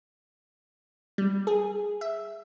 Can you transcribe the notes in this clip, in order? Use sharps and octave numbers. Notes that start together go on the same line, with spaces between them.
G3
G#4
E5